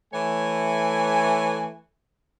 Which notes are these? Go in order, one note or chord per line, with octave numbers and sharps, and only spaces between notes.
E3 A3 C#5 G#5